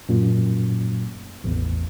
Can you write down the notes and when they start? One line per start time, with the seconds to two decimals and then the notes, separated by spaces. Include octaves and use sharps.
0.09 F#2 A#2
1.44 A1 E2